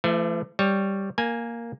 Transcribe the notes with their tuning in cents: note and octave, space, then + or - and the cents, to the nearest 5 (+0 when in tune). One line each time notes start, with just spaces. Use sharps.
E3 +45 A3 +0
G3 +0 C#5 +0
A#3 +0 G#5 +0